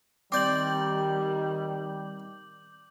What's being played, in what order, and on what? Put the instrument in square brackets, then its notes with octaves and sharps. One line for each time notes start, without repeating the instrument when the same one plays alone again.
[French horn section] D#3 G3 [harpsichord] C4 D5 [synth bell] D6 G6 F#7